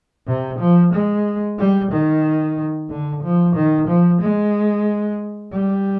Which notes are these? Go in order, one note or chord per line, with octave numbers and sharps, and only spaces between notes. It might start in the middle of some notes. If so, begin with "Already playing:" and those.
C3
F3
G#3
G3
D#3
D3
F3
D#3
F3
G#3
G3